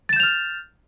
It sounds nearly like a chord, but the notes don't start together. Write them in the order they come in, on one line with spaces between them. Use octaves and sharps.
A6 E7 G6 F7 F6